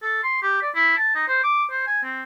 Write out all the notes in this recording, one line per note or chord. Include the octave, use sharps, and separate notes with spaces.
A4
C6
G4
D5
E4
A5
D#4
C5
D6
C5
G#5
C4